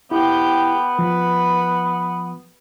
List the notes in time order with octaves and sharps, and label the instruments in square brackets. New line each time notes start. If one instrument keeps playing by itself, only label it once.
[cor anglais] B3 [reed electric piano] E4 [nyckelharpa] G4 G5
[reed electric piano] F3 [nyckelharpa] B4